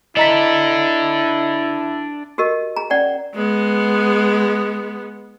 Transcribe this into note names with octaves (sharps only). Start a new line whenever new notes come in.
D4 E4 A4 D#5 A#5 B6
F#4 G4 A#4 D#5
G#4 A#5
C#4 D5 F#5 G5
G#3 B3